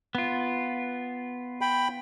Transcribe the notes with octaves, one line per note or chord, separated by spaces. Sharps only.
B3 F4
G5 B5